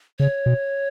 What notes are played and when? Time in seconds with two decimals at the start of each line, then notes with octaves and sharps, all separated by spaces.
0.20 C#3 C#5
0.46 B2